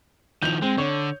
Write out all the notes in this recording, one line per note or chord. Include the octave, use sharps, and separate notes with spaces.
D#3 F3 G6 F7
G#3 C4
D3 C#5